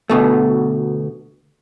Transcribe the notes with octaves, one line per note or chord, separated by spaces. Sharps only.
D2 B2 A3